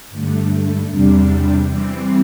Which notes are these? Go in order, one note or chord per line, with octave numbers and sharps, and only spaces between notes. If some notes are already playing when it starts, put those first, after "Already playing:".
G2 D3 A3
E2 C3 G3 D4
E3 G3 C4